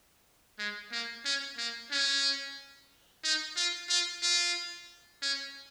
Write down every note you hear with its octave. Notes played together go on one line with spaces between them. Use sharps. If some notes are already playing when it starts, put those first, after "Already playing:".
G#3
A#3
C#4
A#3
C#4
D#4
F4
F4
F4
C#4